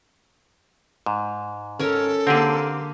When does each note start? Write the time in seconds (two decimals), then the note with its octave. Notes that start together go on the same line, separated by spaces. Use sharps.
1.06 G#2
1.80 C#4 A4 A#4 C#5
2.27 D3 A#3 C4 G4 G#4